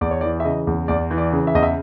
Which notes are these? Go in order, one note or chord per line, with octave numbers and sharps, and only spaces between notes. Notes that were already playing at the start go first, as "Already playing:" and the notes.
E2 D5
C#5
E3 D5
E5
C#3 D#5
E2
E2 D5
E3
D5
C#3
E5
E2 D#5
E5